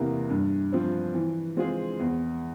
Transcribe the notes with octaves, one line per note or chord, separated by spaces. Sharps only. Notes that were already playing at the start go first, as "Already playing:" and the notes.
Already playing: E2 C3 E3 A#3
G2
F3 C4
E3
G#3 C4 F4 G#4
E2